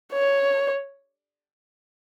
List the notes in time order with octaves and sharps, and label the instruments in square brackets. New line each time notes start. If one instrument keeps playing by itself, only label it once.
[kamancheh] C#5